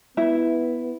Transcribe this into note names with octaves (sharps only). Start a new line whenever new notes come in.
B3 E4 E5